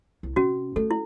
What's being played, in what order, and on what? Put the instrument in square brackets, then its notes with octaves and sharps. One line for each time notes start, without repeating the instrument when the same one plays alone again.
[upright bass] C2
[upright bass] C3 [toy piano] C#4 F#4
[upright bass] A3 [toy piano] A4
[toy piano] E4